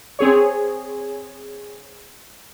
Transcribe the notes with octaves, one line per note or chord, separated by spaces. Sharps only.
C4 G#4 C#5